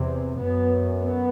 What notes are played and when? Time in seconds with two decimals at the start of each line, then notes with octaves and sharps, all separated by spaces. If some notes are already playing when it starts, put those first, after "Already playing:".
Already playing: E2 C3
0.40 F#2 B3
0.99 B3